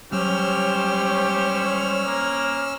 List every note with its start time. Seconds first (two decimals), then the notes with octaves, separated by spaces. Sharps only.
0.12 F#3 G3 C#4 G4 C5 C#5 E6 F6
2.06 A#3